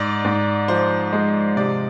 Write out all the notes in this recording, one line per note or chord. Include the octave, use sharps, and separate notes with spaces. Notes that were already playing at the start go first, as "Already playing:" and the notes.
Already playing: G#2 D5
G#2
F3 C5
G#3
C3 D5